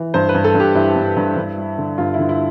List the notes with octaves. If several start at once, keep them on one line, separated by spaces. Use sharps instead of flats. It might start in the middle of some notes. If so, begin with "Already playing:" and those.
Already playing: E3
G2 C5
B4
G2
A4
G2 G4
G2 E4
G2
G2
G2
G3
D3
G2 F4
E4
D3
E4